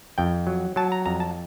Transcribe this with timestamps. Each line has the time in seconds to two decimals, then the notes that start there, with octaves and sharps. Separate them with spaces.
0.18 F2 G5
0.47 F#3
0.76 F#3 A5
0.92 A#5
1.06 F2 A#5
1.20 A5